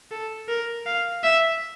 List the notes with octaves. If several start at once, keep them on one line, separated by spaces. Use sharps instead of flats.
A4
A#4
F5
E5